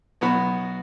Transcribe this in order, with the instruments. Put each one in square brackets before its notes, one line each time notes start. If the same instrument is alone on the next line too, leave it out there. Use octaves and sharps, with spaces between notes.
[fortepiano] B1 B3 F#4 B5